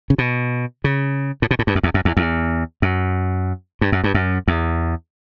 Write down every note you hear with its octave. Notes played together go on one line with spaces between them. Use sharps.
C#3
B2
C#3
A2
B2
A2
G2
F#2
E2
F#2
E2
E2
F#2
G2
F#2
G2
F#2
E2